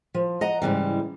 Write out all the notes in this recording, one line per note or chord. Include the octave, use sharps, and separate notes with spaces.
F3
D#5 F#5 A#5
G#2 C#3 E3 G3